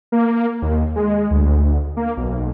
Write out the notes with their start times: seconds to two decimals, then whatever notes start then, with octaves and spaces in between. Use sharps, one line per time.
0.12 A#3
0.62 D#2
0.96 G#3
1.31 D2
1.97 A#3
2.17 B1